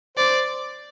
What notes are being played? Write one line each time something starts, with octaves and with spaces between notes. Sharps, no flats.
C5 D5